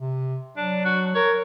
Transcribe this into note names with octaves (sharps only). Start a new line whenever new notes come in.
C3
F#3 D4
F#4
A#4 C#5